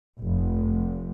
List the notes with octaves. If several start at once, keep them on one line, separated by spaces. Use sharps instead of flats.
F1